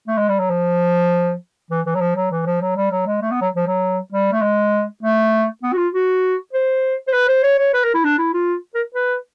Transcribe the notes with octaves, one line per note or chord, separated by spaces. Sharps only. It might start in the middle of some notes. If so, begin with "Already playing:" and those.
A3
G#3
G3
F#3
F3
E3
E3
F#3
F3
F#3
E3
F3
F#3
G3
F#3
G#3
A3
B3
F#3
F3
F#3
G3
A3
G#3
A3
B3
F#4
F4
F#4
C5
C5
B4
C5
C#5
C#5
B4
A#4
E4
D4
E4
F4
A#4
B4